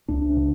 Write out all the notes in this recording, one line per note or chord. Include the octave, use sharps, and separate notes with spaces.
C#2 D4
C#3